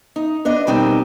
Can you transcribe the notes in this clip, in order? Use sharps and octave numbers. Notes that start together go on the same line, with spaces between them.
D#4
B3 D4 D#5
B2 G3 C4 D#4 A#4